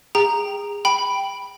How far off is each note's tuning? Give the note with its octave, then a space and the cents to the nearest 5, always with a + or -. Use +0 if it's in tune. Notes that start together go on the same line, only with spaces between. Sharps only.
G#4 -25 G5 +0 A#5 +0
G5 +0 B5 +0